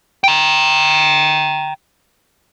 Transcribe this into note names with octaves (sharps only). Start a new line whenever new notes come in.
G5 A#5